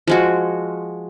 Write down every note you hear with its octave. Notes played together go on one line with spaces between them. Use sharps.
F3 G#3 F#4